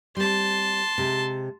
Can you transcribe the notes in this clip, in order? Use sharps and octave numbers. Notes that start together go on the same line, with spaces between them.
G3 C4 A5 C6
C3 G#3